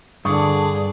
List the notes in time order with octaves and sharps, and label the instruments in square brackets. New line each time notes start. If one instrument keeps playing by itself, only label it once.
[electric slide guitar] G2 [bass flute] D3 [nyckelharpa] G#4 D5 [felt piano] C#6 D#6